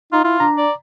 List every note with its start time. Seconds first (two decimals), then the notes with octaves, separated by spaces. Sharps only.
0.12 D#4 F4
0.24 E4 F4
0.40 D4 A#5
0.58 D5